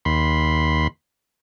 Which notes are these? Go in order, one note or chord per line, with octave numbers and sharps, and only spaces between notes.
D#2 B5 C6